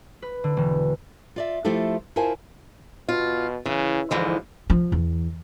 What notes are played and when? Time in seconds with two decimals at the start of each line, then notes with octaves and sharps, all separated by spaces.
0.22 B4
0.44 D3
0.57 E1
1.36 F4 D5 E5
1.64 F3 A3 E4 F4 G4 A4
2.16 E4 F4 A#4 C5 G#5 A5
3.09 B2 F4
3.66 C#3 E3
4.11 G#2 D3 E3 F3
4.70 F3
4.92 E2